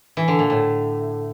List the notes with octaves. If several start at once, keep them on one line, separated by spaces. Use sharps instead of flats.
E3
D3
A#2
A2